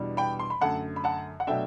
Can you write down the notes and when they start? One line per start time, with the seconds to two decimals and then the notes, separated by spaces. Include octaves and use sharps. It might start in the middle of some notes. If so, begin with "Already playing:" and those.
Already playing: E2 B2 G3 D4
0.17 G5 B5
0.39 C6
0.50 B5
0.61 F#2 D3 A3 F#5 A5
0.96 B5
1.04 F#5 A5
1.40 F#5
1.47 B2 F#3 A3 D4 E5 G5